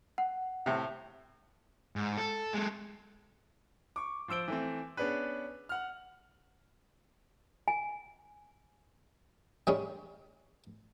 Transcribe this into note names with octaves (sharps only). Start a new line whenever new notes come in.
F#5
A2 C3
G#2
A4
G#3 A4
C#6 D6
F3 C5 E6 D7 G7
E3 A3 C4
B3 C#4 D4 G#4 B4
F#5 F6
G#5
G3 G#3 C#4